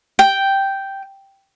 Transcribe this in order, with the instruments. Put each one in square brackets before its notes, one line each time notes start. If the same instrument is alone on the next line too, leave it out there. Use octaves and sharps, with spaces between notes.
[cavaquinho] G5